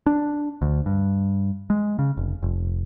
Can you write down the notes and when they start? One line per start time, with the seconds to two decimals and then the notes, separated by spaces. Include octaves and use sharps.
0.06 D4
0.62 D2
0.86 G2
1.70 G#3
1.99 C#3
2.17 F1
2.43 F1